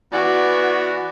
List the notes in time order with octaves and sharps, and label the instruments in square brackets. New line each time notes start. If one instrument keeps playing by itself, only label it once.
[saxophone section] E3 B3 D5 [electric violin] F#4